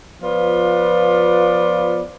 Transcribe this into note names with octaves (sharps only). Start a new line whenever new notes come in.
F3 B3 F4 B4 D5